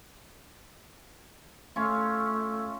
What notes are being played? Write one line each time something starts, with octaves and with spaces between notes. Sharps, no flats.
A3 C#4 F4